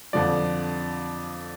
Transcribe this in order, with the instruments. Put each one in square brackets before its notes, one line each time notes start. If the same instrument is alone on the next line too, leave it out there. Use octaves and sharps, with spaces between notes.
[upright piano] F2 D3 F3 [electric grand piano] D5